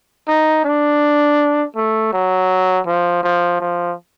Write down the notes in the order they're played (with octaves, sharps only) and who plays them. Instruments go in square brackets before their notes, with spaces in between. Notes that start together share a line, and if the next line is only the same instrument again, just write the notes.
[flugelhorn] D#4
D4
A3
F#3
F3
F3
F3